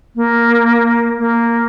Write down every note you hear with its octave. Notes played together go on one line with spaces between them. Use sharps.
A#3
A#3